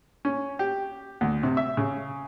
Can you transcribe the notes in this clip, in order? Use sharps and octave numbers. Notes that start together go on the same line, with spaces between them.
C#4
G4
D2
C3
E5
C#3